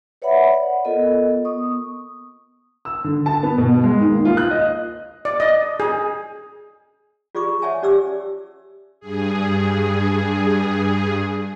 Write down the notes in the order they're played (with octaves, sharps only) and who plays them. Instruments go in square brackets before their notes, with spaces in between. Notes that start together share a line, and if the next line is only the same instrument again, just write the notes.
[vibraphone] B4 C#5 D5 E5 F#5 B5
D5 F#5
B3 F4 A4 A#4 D#5
B3 C#6 D#6
[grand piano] E6
D3
A5
B3
B2
G#3
D#3
A#3
F4
F#6
D#5
[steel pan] D5
D#5
G#4
[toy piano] F4 G#4 D5 C#6 D6
C#5 D5 E5 F#5 G#5 A5
C#4 G4 D5 D6 E6
[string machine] G2 G#4